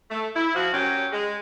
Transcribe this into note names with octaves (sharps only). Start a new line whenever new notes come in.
A3
E4
F3 F#4
A#2 F#3 C#4 G4
G#3